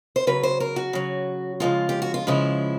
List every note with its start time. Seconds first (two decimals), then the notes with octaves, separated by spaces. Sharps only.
0.16 C5
0.27 C#3 F#3 B4
0.43 C5
0.60 A#4
0.76 F#4
0.93 C#3 F#3
1.60 C#3 F3 G#3 F4
1.89 G4
2.02 F#4
2.14 F4
2.27 C#3 F3 G#3 E4